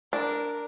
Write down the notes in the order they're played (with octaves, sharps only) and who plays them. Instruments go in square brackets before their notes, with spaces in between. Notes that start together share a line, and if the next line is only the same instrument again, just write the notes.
[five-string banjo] D4 [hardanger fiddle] A#4